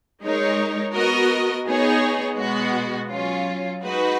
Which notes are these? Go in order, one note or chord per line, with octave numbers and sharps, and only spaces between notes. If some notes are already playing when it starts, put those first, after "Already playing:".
G#3 D#4 A#4 C#5
B3 F#4 A#4 D#5
B3 D#4 G#4 C#5
B2 G#3 B3 F#4
F#3 C#4 F4
G#3 D#4 F#4 B4